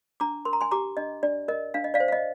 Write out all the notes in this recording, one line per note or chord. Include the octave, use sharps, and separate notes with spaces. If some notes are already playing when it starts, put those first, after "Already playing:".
D4 A#5 D6
A#4 C6
A#5
G#5 C6
G4 A#5 D6
D4 D#5
D4 D5
A#4 D#5
D4 F5
D#5
D5 F5
C5
F5
D#5